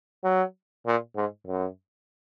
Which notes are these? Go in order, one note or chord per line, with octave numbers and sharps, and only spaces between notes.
F#3
A#2
G#2
F#2